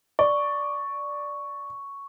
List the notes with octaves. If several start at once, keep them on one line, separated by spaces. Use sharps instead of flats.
D5 C#6